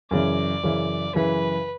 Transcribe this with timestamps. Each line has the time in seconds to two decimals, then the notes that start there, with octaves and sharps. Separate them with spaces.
0.11 F#2 C#3 E3 D5
0.63 F#2 C#3 E3
1.15 F#2 C#3 E3 B4